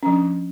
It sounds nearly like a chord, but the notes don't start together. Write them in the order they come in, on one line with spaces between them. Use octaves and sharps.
C#4 F3 D4